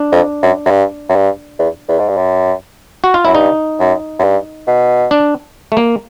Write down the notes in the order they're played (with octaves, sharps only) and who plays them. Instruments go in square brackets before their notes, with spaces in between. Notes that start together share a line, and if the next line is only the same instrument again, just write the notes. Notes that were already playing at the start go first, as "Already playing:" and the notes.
Already playing: [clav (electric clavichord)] D4
[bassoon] F2
F#2
F#2
G2
F#2
G2
E2
E2
G#2
G2
F#2
[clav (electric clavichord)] F#4
F4
[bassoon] F#2 [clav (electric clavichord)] E4
[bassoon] G2 [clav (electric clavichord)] D#4
[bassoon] F#2
F#2
G2
B2
[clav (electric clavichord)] D4
A3
A#3